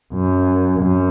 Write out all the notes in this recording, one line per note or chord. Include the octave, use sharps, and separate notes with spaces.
F#2
F#2